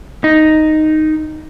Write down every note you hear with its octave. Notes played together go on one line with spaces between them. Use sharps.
D#4